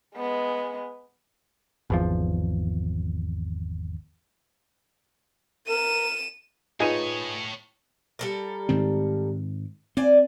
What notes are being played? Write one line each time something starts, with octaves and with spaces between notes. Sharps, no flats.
G#3 B3
G#1 E2 F3
A#4 D#7 E7
A2 D#4 F4 G#4 B4 C#5 D#7
G3 A4 A#4
G#2 D#3 C4
C4 D5 G#5